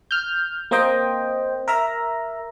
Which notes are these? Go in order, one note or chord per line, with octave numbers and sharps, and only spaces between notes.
F6 G6
A#3 C4 C5 D#5 G5
A#4 E5 A#5